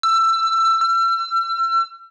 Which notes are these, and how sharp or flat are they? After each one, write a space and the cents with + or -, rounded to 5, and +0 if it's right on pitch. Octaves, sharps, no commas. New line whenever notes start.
E6 +20
E6 +40